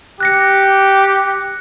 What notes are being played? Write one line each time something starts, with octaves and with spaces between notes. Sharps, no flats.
G4 F#6 A#6 C#7